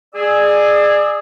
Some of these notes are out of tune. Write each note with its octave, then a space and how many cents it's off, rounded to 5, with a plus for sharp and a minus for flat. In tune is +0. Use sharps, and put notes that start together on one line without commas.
G#4 +0 D5 +30 E6 -10